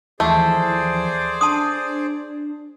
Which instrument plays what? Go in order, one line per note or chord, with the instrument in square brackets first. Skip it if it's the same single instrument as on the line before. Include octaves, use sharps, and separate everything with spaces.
[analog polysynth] D#2 E3 F3 [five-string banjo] A3 [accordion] G#4 C5 D5
[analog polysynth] D4 [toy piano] A5 C6 D#6